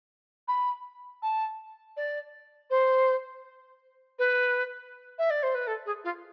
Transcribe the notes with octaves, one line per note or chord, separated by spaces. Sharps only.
B5
A5
D5
C5
B4
E5
D5
C5
B4
A4
G#4
F4